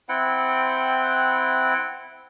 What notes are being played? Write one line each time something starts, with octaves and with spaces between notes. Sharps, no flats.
C4 E4 F#5 G5